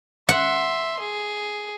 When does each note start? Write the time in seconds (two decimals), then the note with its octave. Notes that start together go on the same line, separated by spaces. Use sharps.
0.29 E5 F#5 C6
1.00 G#4